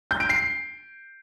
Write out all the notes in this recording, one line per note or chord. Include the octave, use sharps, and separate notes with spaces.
G6
D7
C7